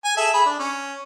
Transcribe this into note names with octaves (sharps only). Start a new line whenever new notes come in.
G#5
G#4 A4 E5
G#4 B5
D4
C#4